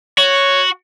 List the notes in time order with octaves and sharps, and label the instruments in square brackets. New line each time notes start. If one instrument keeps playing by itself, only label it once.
[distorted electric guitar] F#4 [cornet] C#5